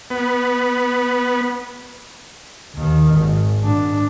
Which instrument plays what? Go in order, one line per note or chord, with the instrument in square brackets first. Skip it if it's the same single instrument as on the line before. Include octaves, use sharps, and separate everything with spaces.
[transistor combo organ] B3
[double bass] D#2 D#3
G#1
G#2 D4